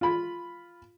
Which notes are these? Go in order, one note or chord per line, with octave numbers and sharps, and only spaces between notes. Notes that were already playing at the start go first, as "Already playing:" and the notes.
F4 B5